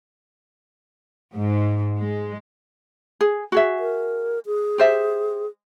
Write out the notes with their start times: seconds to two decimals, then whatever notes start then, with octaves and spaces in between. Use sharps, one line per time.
1.36 G#2
1.97 G#3
3.21 G#4
3.52 F#4 G#4 E5
3.79 A#4
4.46 G#4
4.78 G4 C5 E5